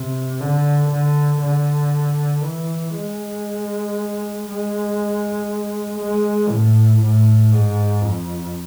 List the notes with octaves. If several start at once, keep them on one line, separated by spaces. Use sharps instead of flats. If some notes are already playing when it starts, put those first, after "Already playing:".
Already playing: C3
D3
D3
D3
E3
G#3
G#3
G#3
A2
A2
G#2
F2